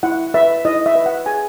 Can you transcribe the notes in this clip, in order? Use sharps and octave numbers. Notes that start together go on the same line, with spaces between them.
E4 F#5
B4 E5
E4 D#5
E5
B4
F#5
G#4 G#5